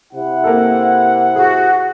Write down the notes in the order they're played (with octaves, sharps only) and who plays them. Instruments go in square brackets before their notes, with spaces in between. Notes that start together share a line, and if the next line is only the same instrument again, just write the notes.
[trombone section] C3 E4 [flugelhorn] F#5
[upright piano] A#3 A4
[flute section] F#4 [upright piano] G#4